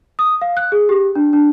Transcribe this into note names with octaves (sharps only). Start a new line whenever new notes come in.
D#6
F5
F#6
G#4
G4
D4
D4